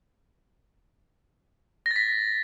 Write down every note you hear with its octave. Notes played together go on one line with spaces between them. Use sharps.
A#6
A6
B6